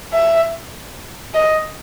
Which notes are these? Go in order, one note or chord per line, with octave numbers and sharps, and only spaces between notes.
E5
D#5